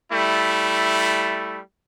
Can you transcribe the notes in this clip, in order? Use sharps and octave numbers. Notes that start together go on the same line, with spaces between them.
G3 A3 E4